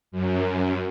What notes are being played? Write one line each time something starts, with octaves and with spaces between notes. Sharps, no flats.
F#2